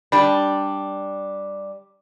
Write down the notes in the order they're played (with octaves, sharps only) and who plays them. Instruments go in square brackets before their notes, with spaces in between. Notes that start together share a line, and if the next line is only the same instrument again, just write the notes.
[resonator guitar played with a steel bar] G3 D4 [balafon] B5